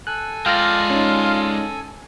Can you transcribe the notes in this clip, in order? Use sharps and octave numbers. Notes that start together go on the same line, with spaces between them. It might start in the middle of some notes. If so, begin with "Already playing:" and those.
A4 G#5 F#6
G#3 F4 D5 G5 F6 A#6
C#4 D#4